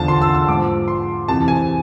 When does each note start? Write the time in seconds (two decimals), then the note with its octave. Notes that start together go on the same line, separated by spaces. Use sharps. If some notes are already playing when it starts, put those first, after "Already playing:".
Already playing: E2 D3 F3 A5
0.08 C6
0.22 E6
0.35 E6
0.48 G#2 F3 D6
0.88 C6
1.28 F2 C3 E3 A5
1.48 G#5